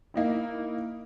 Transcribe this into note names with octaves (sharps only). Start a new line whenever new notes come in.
A#3 D#4 E4